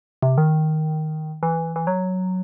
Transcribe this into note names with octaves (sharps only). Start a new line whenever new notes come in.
C3
D#3
E3
E3
F#3